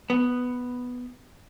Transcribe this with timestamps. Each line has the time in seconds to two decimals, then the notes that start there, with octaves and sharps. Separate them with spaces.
0.10 B3